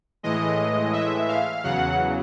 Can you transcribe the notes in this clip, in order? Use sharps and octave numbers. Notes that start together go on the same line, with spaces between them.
A2 E3 G#3 D#5
E5
F5
E2 C#3 F#3 F#5